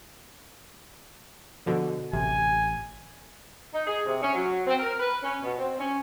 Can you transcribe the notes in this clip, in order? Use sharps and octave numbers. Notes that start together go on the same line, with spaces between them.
B2 D3 F3
A1 C3 G#5
D#4
G#4
C3
C#4
F#3
C4
A#4
B4
C#4
B2
C4
C#4